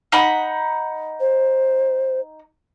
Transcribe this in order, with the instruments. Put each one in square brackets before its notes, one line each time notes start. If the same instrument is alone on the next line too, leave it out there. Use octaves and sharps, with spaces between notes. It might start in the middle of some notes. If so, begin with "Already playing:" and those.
[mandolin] D#4 F#5 B5
[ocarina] C5